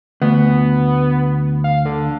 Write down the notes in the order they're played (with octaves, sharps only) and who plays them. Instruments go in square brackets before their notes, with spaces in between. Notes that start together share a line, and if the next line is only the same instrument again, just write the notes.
[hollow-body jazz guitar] D2 [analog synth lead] B3
[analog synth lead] F5
D3